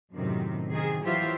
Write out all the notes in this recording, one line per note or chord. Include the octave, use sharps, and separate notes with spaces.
F#2 A2 C3 D#3
C3 D#3 G#4
E3 F#3 F4 G4 C5 E5